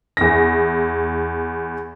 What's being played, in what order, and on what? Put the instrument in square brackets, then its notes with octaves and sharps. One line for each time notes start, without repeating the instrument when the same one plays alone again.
[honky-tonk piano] E2 A#6